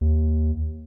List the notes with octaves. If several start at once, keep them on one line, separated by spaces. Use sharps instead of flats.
D#2